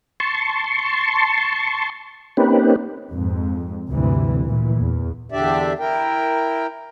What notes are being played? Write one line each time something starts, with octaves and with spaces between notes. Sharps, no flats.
A5 C6 C#6
A#3 C4 C#4 D#4 G4 B4
F2 G#2
D2 G2 C3 E3
A#2 E3
E2
E2 D3 D4 G4 D5 E5
E4 A#4 G5